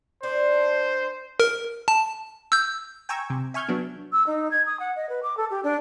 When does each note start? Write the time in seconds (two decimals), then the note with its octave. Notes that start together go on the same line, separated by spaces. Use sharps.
0.23 D4 C5
1.40 A#4
1.88 A5
2.52 E6 G6
3.09 G5 G#5 A#5 C#6 E6 G#6
3.30 C3
3.54 E5 G#5 C#6 F6 G6 G#6
3.68 F#3 B3 D4
4.12 E6
4.26 D#4
4.51 G#6
4.66 D#6
4.79 F#5
4.96 D#5
5.09 B4
5.22 D6
5.37 A4
5.50 G4
5.63 D4